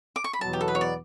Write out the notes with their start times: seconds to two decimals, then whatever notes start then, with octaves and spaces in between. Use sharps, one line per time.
0.16 D6
0.24 C#6
0.33 B5
0.41 E2 B2 F#3 B3 A5
0.53 G4
0.61 A4
0.68 B4
0.75 C#5
0.81 D5